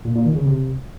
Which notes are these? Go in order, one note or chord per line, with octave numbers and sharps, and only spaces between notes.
A#2
A#2
D#3
C#3
C3